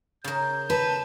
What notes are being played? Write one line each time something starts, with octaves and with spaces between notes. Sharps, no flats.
C#3 A#4 G6
B4 A5